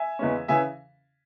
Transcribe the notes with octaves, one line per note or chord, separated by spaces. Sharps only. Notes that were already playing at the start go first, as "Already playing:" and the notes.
Already playing: E5 G#5
E2 C#3 E3 G#3 C#4
C#3 E3 E5 G#5